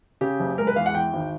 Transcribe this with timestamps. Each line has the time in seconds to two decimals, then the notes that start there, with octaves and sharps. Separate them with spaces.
0.21 C#3 G4
0.40 F#1
0.58 G#3 A#4
0.67 B4
0.76 E2 F5
0.86 F#5
0.95 E3 G5
1.13 G#1